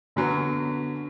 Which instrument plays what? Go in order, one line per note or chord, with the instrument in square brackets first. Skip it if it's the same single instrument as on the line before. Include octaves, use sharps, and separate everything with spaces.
[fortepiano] F#2 F#3 B3 [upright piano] D3